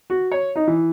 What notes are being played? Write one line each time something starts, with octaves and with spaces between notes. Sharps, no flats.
F#4
C#5
D#4
E3